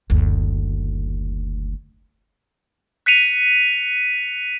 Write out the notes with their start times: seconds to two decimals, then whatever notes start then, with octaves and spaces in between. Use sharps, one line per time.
0.10 F#1 D2
3.06 F#6 B6 C#7 D#7 F7